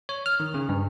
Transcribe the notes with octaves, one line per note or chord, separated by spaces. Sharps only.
C#5
F6
D#3
C#3
G2